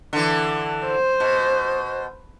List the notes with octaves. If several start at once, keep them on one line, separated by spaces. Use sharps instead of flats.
D3 E3
C5
B2